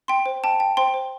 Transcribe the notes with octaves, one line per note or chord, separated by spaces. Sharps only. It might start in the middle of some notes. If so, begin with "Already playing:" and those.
G5 C6
C5
G5 A5
G5
C5 G5 C6
C5